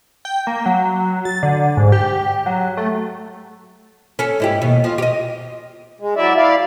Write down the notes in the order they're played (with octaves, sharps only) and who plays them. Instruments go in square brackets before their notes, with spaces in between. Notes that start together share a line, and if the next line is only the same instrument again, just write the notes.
[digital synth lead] G5
A#3
F#3
A6
D3
G#2
G4
F#3
A3
[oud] C#4 A4
G#2 E4 G4
D#2 B2
F3
G4 D#5
[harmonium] G#3
F#3 E4 D5 E5
E4 D5 F5